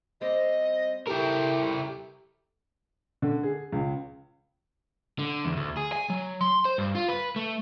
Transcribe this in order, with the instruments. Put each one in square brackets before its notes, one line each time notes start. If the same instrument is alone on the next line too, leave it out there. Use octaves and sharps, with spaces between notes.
[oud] G3 C4 D5 [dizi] D#5
[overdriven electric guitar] E4 A#4 [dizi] G4 [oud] A4
[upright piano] D3
G#4
C#2
[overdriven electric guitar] D3
E2
D2
G#4
G#5
F#3
C6
C5
G2
F4
B4
A3